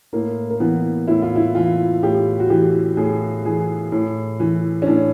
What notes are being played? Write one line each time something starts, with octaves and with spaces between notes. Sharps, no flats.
A2 A#3
A#3
E3 B3
A2 E4
F4
E4
E3 F4
A2 G4
F#4
E3 G4
A2 G#4
E3 G#4
A2
E3
C#4
A2 D4